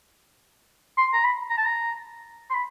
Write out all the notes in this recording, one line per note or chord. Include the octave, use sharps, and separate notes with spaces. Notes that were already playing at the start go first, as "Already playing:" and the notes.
C6
A#5
B5
A#5
A5
A#5
C6
B5